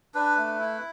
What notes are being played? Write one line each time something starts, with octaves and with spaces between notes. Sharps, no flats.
D4 B4
A3
E4